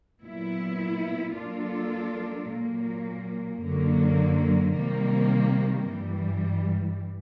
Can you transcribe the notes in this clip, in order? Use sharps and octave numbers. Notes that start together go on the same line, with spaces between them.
A#2 F#3 B3 E4
F#3 A#3 D4 F4 A4
A#2 F#3 A#3
F#2 D3 F#3 A#3
C3 D#3 G3 A#3
G2 E3 G3